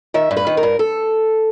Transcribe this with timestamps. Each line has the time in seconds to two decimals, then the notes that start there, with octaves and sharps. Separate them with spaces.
0.14 D#3 E5
0.31 G2
0.37 B4
0.47 D#3
0.57 A#4
0.63 G2
0.79 A4